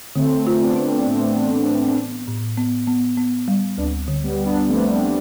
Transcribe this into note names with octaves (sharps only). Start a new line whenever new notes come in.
D3 A3 C4
F4
B3 D4
D4
A2 A3 C4
E3
A2
B3
A2
B3
B3
B3
G3
D2 B3 D4
D3
G3 B3
D3
B3 D4
F3 A3 C4
G3 B3